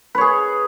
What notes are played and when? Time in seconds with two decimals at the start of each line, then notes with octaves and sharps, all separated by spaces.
0.15 B4
0.18 C#5
0.21 G#4